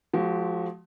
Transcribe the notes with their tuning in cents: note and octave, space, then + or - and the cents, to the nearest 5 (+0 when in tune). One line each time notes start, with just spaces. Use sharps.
F3 +10 G#3 +40 F#4 +35